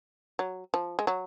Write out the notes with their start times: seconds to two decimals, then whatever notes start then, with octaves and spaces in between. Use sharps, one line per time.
0.39 F#3
0.74 F3
0.99 G#3
1.07 F#3